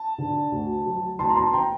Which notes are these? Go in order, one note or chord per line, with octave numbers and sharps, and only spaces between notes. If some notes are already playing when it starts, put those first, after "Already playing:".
Already playing: A5
D3
D2
F#3
D2 A5 C6
A#5
A5 C6
G5 A#5